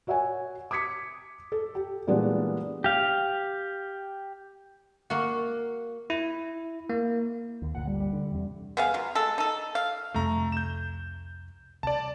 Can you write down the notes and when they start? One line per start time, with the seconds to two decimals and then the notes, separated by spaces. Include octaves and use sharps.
0.07 F#4 C#5 E5 F#5 G#5
0.71 D6 D#6 G#6 B6 C#7
1.52 A4
1.75 G4
2.07 A#2 E3 G3 G#3 B3 D4
2.84 G4 F5
5.10 A#3 F#4
6.10 E4
6.90 A#3
7.62 D#2
7.75 G1 D2 A#2 F#5
7.88 G3
8.00 G3
8.13 D3
8.32 E2 C3
8.77 B3 G#4 F5
8.94 F#3 F4
9.15 G#3 A4
9.38 D#4 A4
9.75 F5
10.14 C2 F2 C3 A3 A#5
10.52 G6 E7
11.83 C2 D5 A5